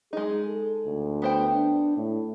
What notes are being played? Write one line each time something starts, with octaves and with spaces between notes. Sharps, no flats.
G#3 D#4 G#4
A4
D2
B3 C5 G5
D4
A2